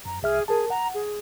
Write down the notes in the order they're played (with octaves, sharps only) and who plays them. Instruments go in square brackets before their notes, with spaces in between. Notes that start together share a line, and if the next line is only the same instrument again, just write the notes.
[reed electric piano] F#2 [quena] A#5
[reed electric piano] C2 E5 F6 [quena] G#4
[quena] G#4 [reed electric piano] A#4 A5
[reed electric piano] F#5 [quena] A#5
[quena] G#4